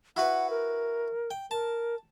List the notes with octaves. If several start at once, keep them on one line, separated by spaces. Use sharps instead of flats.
E4 F#4 B4 F#5
A#4
G5
A#4 A5